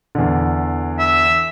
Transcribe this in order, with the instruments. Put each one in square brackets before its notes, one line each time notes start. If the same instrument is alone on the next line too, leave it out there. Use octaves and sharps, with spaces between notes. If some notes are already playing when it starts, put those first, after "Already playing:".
[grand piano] E2 D3
[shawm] E5